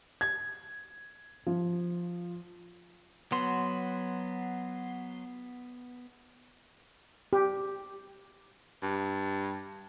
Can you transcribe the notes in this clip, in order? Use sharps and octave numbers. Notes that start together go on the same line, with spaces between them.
G#6
F3
F#3 B3 C6
G4
G2